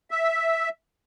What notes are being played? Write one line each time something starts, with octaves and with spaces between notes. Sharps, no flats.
E5